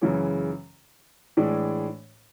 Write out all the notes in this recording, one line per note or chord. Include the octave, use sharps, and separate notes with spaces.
F#2 C#3 E3 G#3 C#4
A2 E3 G#3 D4